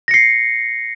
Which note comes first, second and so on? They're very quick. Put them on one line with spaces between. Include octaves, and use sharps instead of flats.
A#6 C#7 C7